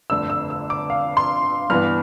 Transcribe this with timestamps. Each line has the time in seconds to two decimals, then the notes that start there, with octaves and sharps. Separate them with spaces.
0.10 G1 F2 D3 A3 E6
0.30 E6
0.50 E6
0.70 D6
0.90 F5
1.17 C6
1.70 G2 E3 B3 F6